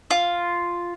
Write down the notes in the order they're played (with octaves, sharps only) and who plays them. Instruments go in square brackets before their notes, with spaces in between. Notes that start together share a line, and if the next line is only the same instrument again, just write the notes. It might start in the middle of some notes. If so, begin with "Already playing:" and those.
[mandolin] F4